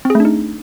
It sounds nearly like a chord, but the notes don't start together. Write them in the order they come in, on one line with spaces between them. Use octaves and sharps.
C4 G#4 A3 D4 D#4